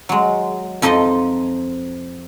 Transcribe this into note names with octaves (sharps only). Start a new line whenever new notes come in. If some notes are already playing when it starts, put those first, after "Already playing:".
F#3 G#3
F2 F3 D#4 D#5 C6